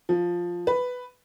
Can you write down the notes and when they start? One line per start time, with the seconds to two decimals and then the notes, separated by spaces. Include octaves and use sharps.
0.09 F3
0.67 B4